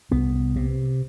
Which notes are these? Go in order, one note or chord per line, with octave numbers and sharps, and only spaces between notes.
C2 B3
C3